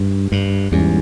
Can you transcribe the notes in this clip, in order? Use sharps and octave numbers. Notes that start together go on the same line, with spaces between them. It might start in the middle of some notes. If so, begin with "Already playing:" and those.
Already playing: G2
G2
E2 G#2 G3 C#4 E4